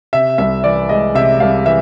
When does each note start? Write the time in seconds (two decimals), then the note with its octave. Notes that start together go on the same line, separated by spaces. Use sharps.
0.13 C3 E5
0.38 C2 E5
0.64 E3 D5
0.89 G#3 D#5
1.15 C3 E5
1.40 C2 F5
1.66 E3 E5